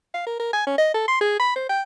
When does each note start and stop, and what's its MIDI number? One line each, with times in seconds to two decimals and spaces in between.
0.14 0.26 77
0.27 0.35 70
0.39 0.52 70
0.53 0.62 80
0.67 0.75 61
0.78 0.91 75
0.94 1.07 69
1.08 1.21 84
1.21 1.39 68
1.40 1.55 83
1.56 1.66 72
1.69 1.82 79